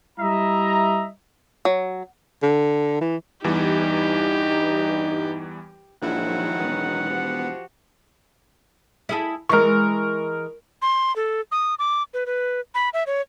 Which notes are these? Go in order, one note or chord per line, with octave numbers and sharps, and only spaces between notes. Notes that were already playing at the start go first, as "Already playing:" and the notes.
G3 E4 D#5 E5 A#5
F#3
D3
E3
E2 G2 E3 G3 D#4 G4
A#1 D#3 F3 F#3 G#3 E4 F#5
E1 B3
F3 F#4 G4
E4 G#4 A4
E3 G#3 A#4 C#6
C6
A4
D#6
D6
B4
B4
B5
E5
C#5